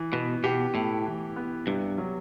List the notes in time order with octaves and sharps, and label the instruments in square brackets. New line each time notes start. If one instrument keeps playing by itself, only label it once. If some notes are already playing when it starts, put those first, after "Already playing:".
Already playing: [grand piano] E3
[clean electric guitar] B2 [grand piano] B3
[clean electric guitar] B2 [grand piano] G4
[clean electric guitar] A2 [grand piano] E4
[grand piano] E3
B3
[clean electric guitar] G2 [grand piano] C3
[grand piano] F#3